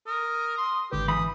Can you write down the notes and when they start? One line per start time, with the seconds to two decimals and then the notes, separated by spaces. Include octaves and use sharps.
0.07 A#4 D#6
0.58 C6
0.92 G#1 D3 G4 B4
1.08 E3 B5 D#6